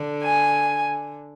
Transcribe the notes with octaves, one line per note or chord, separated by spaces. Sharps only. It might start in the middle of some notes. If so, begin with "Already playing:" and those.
Already playing: D3
G#5